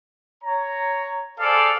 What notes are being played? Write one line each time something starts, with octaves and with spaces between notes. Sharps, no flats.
C#5 A#5
G#4 A4 C5 D5 F5